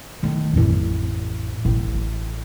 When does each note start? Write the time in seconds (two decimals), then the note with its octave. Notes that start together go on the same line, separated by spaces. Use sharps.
0.23 D#3 A3
0.53 A1 F2
1.65 A1